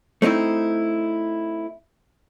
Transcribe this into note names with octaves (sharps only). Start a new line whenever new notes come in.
A3 C4 D#4 E4